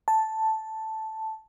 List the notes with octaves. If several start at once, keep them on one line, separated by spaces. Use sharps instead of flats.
A5